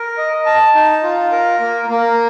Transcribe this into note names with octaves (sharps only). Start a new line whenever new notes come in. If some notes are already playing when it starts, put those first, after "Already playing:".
Already playing: A#4
D#5
A5
D#4
F4
A#4
A#3
A#3